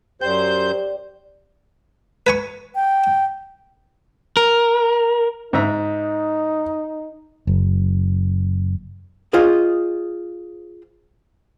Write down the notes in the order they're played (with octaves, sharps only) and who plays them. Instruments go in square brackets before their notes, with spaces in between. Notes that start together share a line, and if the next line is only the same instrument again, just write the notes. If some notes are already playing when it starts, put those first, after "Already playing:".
[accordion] F#2 C5 G6 [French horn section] G4 [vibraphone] D5 G5
[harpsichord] B4 G#5 C#6
[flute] G5
[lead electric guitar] A#4
[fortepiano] G#2 E5 A#5 [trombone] D#4
[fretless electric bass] F#1
[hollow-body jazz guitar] F4 G#4 C5 D#5